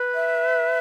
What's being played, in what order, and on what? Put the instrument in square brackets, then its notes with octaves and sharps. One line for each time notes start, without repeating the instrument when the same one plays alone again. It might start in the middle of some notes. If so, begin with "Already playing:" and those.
Already playing: [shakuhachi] B4
[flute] E5